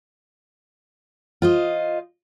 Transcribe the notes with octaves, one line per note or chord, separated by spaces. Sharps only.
F4 C5 D#5